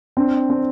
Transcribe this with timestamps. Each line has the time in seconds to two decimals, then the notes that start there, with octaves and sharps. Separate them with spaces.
0.17 C4 D4
0.49 C4 D4